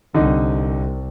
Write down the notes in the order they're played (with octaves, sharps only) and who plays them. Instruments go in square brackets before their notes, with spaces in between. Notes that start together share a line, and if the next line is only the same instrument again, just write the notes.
[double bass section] C2 [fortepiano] D3 D#4